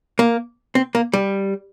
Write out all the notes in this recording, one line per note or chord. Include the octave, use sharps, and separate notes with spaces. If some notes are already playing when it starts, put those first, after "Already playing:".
A#3
C4
A#3
G3